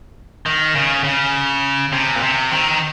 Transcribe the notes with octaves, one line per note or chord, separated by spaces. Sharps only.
D#3
C#3
C#3
C3
A#2
C3
D#3